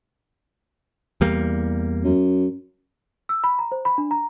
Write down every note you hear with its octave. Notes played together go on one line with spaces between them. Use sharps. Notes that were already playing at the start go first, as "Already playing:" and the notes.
E2 G3 A#3
F#2
E6
B5
A#5
C5
B5
D4
A#5